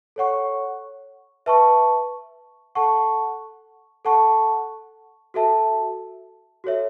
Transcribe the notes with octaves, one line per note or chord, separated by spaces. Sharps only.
A4 C#5 F#5 C#6
B4 E5 A5 C#6
A4 F#5 A5 C#6
A4 F#5 A5 C#6
F#4 A4 E5 A5
F#4 A4 C#5 E5